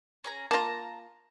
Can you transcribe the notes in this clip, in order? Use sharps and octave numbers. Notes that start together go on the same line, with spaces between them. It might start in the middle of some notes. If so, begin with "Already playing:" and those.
C#4 G#4 A#5
A#3 F4 A5 A#5